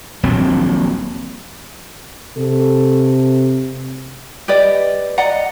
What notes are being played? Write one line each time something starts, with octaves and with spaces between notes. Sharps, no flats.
D#1 A#1 F#3 C4
C3 A4
G4 B4 D5 D#5
D5 D#5 F#5 A#5